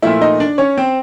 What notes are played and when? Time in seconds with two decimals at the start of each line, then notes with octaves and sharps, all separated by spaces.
0.02 A#2 F3 A3 E4 E5
0.21 D#4 D#5
0.40 D4 D5
0.58 C#4 C#5
0.78 C4 C5